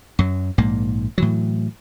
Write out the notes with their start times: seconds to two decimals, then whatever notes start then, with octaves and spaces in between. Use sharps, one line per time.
0.19 F#2 F#3
0.58 A#1 G#2 A#3
1.18 A2 E3 F#3